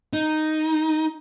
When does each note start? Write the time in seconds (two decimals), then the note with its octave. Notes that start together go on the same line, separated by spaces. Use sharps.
0.13 D#4